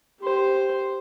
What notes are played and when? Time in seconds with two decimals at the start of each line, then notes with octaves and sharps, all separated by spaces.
0.21 G4 C5